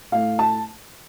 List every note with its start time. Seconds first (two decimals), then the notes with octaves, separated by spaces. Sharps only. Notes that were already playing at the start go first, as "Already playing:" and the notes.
0.12 A2 A3 F5
0.39 A5